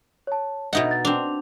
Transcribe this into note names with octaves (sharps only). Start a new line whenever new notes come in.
C#5 A5
B2 D#4 D#5 E5 F#5
A6
C4 D4 F7